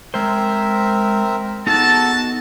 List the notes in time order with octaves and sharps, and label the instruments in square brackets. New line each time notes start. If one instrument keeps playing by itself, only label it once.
[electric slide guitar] G#3 C5 [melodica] C4 A#4 E5
[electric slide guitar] B3 D#4 G#4 [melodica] F#4 A4 [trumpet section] A5